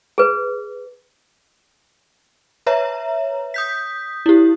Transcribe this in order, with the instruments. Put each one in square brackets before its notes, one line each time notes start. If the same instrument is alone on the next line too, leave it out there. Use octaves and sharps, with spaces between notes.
[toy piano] G#4 B4
[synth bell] B4 C#5 E5 A#5
D#6 G6 B6
E4 G4